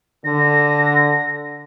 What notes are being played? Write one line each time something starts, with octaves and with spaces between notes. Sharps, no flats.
D3 A#6